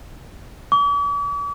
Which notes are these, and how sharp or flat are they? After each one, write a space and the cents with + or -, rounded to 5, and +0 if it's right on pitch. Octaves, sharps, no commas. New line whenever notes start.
D6 -45